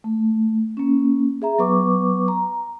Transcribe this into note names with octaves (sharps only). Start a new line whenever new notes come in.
A3
A#3 C#4
G#4 E5 A#5
F#3 B3 B4 C#6 D6
A#5